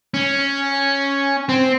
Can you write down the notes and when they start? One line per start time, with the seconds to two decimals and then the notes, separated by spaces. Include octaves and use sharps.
0.14 C#4
1.49 C4